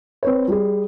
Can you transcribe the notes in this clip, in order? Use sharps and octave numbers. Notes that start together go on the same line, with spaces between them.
C4 B4 C#5
G3 G#4